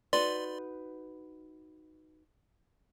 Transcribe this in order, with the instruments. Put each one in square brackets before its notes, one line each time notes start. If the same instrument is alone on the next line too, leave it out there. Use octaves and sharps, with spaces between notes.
[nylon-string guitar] D#4 F#4 B4 [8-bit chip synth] D5 C6